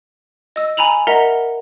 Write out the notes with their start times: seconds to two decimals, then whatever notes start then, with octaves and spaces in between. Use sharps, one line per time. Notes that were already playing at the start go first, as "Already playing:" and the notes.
0.56 D#5 E6
0.77 G#5 A#5 B5 F7 F#7
1.07 A#4 D#5 E5 F#5 A#5